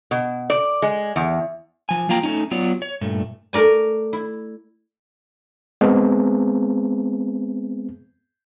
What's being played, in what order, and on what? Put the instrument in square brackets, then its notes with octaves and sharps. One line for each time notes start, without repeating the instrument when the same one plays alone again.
[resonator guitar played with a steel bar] B2
D5
G#3
E2
[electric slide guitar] F3 G#5
F3 A#3 F4 F5 G5 A#5
A3 C#4 D#4
F#3 B3 F4 C#5 D5
C#5
G2 A#2 A3
[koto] A3 A#4 D5 G#5
E4
[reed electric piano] G#3 B3 C4 G#4